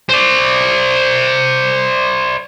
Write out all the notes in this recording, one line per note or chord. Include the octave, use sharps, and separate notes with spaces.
C5 D5